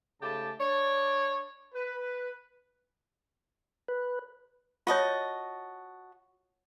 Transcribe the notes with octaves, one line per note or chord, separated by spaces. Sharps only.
G#2 C#3 A3 G4 A5
D4 C#5 D5
B4
B4
F4 F#4 C#5 D#5 A5